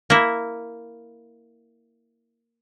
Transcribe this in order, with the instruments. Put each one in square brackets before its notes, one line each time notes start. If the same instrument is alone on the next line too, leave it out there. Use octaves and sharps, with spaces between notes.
[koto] A#3 E4